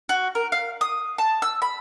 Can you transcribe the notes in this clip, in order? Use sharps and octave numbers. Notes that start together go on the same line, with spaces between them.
F#4
A#4
F5
D#6
A5
E6
B5